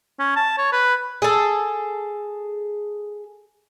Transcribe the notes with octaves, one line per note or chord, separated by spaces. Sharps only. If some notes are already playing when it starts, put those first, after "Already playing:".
C#4
A5
C#5
B4
G#4 A4